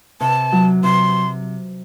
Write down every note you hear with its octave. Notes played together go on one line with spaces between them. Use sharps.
C3 A5
F#3
C3 C6